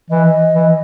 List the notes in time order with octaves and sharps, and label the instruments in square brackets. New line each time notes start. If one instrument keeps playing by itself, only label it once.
[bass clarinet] E3 [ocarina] D#5
[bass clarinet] E3